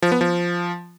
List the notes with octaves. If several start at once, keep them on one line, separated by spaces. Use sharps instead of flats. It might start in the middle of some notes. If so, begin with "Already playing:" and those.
F3
B3
F3